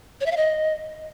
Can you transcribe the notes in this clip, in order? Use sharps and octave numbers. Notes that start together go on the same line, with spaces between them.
C#5
E5
F5
D#5